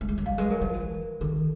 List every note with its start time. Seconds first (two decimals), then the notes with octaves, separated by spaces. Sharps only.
0.01 A3
0.09 G#3
0.18 G3
0.26 F#3 D#5 F5
0.38 G#3 B4
0.50 F#3 A#4
0.61 F3 A#4
0.74 E3
1.21 D#3 A4